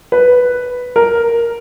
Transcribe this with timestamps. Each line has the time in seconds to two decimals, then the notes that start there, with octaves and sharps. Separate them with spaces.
0.12 B4
0.96 A#4